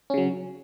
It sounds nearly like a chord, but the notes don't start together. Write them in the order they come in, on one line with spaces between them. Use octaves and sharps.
C#4 C#3 F#3